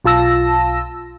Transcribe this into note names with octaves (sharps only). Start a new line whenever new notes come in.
B1 F4 A5 E6 A#6